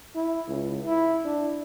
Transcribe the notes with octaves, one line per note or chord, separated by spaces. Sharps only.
E4
C#2
E4
D4